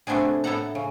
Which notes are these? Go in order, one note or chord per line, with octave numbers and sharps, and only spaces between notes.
C3 A3 B3 C4 D4 G#4
A2 B3 E4 A4 F#5 A#5
C#3